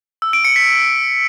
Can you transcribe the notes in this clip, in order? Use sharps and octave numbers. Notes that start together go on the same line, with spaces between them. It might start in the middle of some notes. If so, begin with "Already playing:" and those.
E6
D7
C#7
B6